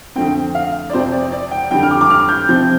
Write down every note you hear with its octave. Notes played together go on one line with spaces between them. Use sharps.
F2 D3 A3 C4 G5
F5
D5
F2 C3 F3 C5
D5
D5
G5
F2 D3 G3 G5
F6
D6
D6
F6
G6
C3 F3 C4 G6